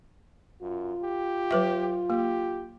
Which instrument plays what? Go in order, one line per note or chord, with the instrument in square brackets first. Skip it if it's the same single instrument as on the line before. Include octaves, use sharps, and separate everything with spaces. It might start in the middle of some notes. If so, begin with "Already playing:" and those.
[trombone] F#2 [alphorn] F4
[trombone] G4
[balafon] F#3 B4 E5
[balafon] A#3 [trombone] G4